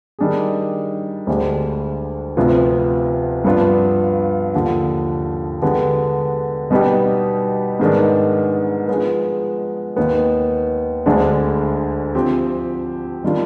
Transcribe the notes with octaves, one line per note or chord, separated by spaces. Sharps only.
D#3 G3 D4 G#4
D2 D3 G#3 D4 G4
D2 C3 F3 B3 F4
G2 F3 B3 D4 F4
D#2 D3 F3
D3 G#3 B3 D4 G4
B2 G3 B3 D#4 G4
G#2 D#3 G#3 B3 D4
F3 G#3 B3
D#2 D#3 B3
D2 D3 G#3 D4
F3 C4 G4
D#3 G3 D4 F4